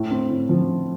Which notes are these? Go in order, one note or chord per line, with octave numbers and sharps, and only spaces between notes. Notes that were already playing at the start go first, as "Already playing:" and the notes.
Already playing: A2
C4
A2
F3